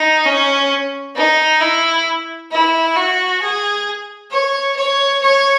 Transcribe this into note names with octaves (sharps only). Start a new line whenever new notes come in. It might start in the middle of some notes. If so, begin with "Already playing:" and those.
Already playing: D#4
C#4
D#4
E4
E4
F#4
G#4
C#5
C#5
C#5